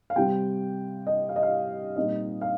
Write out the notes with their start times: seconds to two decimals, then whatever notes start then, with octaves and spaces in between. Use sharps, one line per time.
0.10 F5
0.16 C3 G3 C4 G5
1.07 D#5
1.29 F5
1.36 D#5
1.43 F5
1.96 A#2 G3 C4 D#4 D#5
2.41 F5